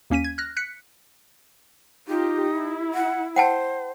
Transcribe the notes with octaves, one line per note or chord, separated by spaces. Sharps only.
D#2 A#3 C#4 B6 D#7
G#6
F6 F#6 A#6
F#6 B6 C#7
D#4 F4 G4
E4
F#5
C5 F#5 G5 A5